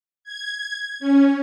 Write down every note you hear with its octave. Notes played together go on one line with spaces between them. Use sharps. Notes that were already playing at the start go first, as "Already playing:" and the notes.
G#6
C#4